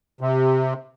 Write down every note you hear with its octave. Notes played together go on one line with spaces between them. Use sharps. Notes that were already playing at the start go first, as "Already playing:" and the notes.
C3